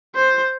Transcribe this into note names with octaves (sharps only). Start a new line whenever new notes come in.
C5